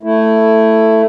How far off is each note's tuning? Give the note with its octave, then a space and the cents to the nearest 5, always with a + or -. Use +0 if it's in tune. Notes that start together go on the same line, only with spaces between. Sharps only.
A3 +10 E4 +5